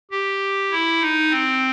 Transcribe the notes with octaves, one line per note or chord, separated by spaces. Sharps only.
G4
E4
D#4
C4